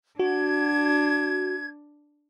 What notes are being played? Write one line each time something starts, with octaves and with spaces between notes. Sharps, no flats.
D4 F#4 G#6